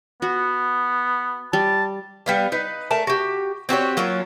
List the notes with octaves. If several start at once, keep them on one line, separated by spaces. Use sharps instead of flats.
B3 F#4
G3 A5
G3 B3 F5
D#4 B4
A3 A#4 A5
F#4 G4
C4 F#4 G4 C#5
F#3 A#3 C#4 F4